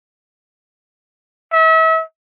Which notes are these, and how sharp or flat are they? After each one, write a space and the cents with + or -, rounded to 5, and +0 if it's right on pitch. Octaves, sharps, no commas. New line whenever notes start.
E5 -35